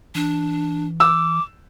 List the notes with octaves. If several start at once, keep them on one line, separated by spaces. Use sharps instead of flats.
E3 D4
D6 E6